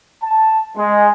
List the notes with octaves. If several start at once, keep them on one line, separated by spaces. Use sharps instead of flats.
A5
G#3